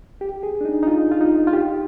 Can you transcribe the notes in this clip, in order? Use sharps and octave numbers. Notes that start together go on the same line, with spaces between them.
G4
G#4
D4
D#4
D#4
F4
F4
D#4
F4
G4